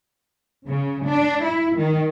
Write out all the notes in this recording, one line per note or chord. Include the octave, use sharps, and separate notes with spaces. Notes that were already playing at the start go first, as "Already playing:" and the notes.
C#3
D4
E4
D#3